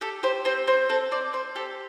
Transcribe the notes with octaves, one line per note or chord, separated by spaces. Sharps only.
G4 A4
G4 C5
C4 C5
C4 C5
C4 A4
C4 D5
C4 C5
G4 A4